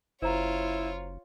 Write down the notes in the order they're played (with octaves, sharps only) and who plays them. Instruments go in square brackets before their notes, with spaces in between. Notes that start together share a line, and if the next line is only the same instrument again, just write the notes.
[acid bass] F#1 [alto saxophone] E4 [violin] F4 C#5 [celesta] C5 A#5